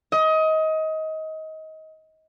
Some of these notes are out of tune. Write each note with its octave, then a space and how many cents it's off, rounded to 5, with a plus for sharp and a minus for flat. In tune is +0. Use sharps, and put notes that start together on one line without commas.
D#5 +25